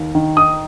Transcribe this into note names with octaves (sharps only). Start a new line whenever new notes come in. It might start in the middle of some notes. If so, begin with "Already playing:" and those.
Already playing: D#2
D#3
D#4 D#6